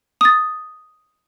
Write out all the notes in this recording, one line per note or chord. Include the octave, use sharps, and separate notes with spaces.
D#6 A6